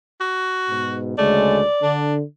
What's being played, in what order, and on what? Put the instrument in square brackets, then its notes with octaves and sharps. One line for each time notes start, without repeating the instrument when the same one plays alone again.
[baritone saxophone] F#4
[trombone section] G#2 B2
[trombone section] D2 C#3 G#3 [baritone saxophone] A3 [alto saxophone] D5
[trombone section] D3 [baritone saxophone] D4